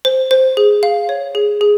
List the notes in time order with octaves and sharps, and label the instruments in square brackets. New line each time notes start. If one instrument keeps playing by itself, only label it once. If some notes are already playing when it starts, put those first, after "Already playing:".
[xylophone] C5
C5
G#4
F5
C#5
G#4
G#4